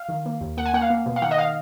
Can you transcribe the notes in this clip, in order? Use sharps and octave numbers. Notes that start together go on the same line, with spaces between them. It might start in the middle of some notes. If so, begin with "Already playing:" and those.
Already playing: F5
D#3
A#3
D#2
A#3 F#5
G#5
A#3 F#5
F5
A#3
B2
F5
D#3 F#5
D#5
F5